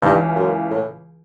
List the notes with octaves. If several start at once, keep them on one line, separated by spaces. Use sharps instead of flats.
C#2 G2 C#3 E3
F#2
A2